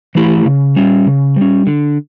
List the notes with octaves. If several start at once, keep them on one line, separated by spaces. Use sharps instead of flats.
E3 A3 E4 G4
C#3
G3 C#4
C#3
G3 C#4
D3